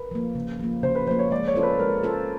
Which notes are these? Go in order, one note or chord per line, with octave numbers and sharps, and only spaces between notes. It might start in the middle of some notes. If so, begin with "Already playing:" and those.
Already playing: A#4 B4
F3 A#3
C#3
F3 A#3
C#3 C5
B4
F3 A#3 C5
C#5
G#3 D5
C#5
C#4 F4 A4 C5
B4
G#3 A#4
C#4 F4 A4 C5